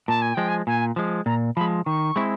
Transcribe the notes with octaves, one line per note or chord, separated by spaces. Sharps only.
A#2 A5
G#5
F3 G#3 G5
G#5
A#2 G#5
F3 G#3
A#2 A#5
F3 G#3 B5
D#3 C#6
G#3 C4 E4